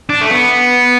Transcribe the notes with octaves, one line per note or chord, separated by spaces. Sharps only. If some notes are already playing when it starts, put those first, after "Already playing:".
D4
A3
B3